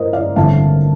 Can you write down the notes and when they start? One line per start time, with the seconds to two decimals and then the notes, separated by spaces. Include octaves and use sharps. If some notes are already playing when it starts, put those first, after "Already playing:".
Already playing: A2 A#4 C5 D#5
0.13 D5 F5
0.36 A1 G2 D3 A3 C4 F5 A5